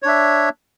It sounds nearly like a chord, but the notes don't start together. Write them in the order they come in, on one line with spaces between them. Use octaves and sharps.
C#5 D4 E5